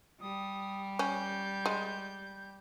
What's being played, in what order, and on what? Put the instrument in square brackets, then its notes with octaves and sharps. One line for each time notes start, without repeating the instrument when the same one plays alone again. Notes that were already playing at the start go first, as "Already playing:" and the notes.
[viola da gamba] G3 [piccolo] D#6
[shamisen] C#4 [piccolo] G6
[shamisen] G#3